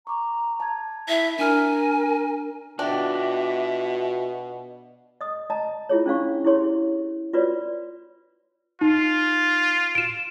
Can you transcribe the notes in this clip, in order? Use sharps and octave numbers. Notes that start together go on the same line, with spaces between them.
A#5 C#6 D6
A5 G#6
E4 E5
D4 A#4 G#5 F6
B2 D4 F4 F#4 E5 G5
D#5 D#6
D#5 A5 A#5
E4 F4 G#4 C#5
C#4 D4 F5 C#6
E4 G4 G#4 C#5 C6
F4 F#4 B4 C#5 D5
D#4 F4
D7 E7